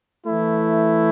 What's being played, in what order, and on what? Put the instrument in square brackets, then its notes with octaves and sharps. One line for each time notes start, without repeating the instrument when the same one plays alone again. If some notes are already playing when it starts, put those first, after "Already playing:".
[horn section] E3 A3 E4